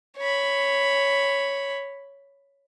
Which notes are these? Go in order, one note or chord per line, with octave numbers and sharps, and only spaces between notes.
C#5 B5